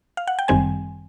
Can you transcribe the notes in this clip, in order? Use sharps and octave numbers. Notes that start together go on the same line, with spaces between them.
F5
F#5
G5
G1 F#2 D#3 G3 C4 G#5